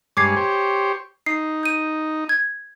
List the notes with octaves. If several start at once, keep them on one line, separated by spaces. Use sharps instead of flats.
G2 G#3 C#5 D6 G#6 C7
G4 C5 C#5
D#4 C7
G6 D#7
G#6